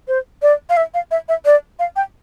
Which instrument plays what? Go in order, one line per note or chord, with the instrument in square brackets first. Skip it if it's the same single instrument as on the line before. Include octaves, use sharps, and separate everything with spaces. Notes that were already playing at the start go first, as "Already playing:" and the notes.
[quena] C5
D5
F5
E5
F5
E5
E5
D5
F5
G5